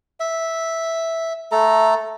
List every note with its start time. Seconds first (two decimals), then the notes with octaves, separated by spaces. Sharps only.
0.20 E5
1.52 A3 A4 A#5